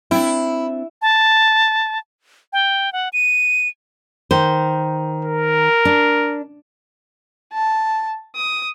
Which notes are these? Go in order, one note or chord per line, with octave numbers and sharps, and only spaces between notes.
C4 D4 E4
A5
G5
F#5
D#7
D#3 C5
A#4
D4
A5
D#6